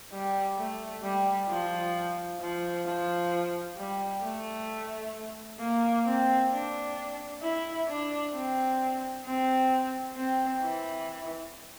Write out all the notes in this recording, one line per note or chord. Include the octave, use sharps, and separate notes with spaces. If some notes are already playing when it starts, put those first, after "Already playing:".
G3
A3
G3
F3
F3
F3
G3
A3
A#3
C4
D4
E4
D4
C4
C4
C4
E3